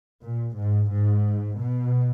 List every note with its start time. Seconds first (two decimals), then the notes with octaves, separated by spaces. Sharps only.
0.22 A#2
0.56 G#2
0.90 G#2
1.59 B2